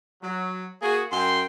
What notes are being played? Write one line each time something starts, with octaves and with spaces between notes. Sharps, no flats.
F#3
A#3 F#4 G#4
F#2 G5 C6